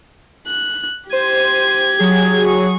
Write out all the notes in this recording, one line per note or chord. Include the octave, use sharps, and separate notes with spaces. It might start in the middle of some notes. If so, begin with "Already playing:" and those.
F#6
G4 C5 G#6 D#7
F#3 G#4
C#6